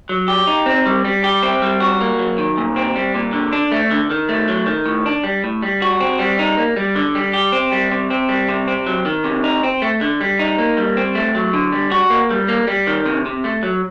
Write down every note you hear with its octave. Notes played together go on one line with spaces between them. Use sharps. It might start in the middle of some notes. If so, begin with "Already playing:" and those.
F#3
G4
D#4
C4
G3
G3
G4
C4
G3
F#4
A#3
F#3
D#3
A#2
C4
G3
A#2
D3
D4
A3
D3
D#3
A3
F#3
D#3
A2
D4
G3
A2
G3
F#4
C4
G3
D#4
A#3
G3
D3
G3
G4
C4
G3
C3
C4
G3
C3
C4
F#3
D#3
C3
D#4
C4
A3
D3
G3
D#4
A#3
G3
C4
A3
F#3
D3
G3
F#4
A#3
G3
A#3
G3
D#3
C3
C3
A3
F#3